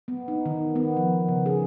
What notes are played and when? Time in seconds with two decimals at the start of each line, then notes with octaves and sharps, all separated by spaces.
0.08 B3
0.28 D#4
0.46 D#3
0.76 B3
0.97 F3
1.28 C#3
1.46 G#4